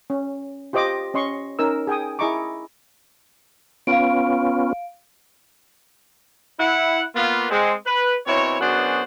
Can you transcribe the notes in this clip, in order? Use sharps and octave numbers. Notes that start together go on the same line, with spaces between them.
C#4
F4 G4 C5 D#5 D6
C#4 D#5 C6 C#6
C#4 D#4 A#4 E6
G#4 G5 G#5 D#6
E4 G#4 D#5 A#5 C#6 D6
B3 C#4 F4 F5 D7
E4 F#5
A#3 B3 F4
G#3 C4
B4
B2 C4 E4 C#5
F#2 B3 D4 F#4 G#4 C5